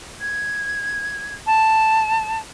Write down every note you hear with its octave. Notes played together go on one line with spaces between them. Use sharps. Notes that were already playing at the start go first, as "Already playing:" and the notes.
G#6
A5